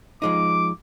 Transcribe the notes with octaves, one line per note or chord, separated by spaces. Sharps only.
F3 G#3 D#4 D6